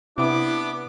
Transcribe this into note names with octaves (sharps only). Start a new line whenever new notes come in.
C3 B3 D4 E4 D6